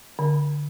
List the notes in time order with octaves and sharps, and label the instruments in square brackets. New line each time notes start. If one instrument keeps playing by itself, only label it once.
[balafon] D3